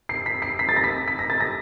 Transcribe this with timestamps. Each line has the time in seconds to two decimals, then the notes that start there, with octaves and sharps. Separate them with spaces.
0.09 C7
0.26 B6
0.42 C7
0.59 B6
0.69 A6
0.76 A#6
0.84 B6
1.08 B6
1.19 A#6
1.30 A6
1.40 A#6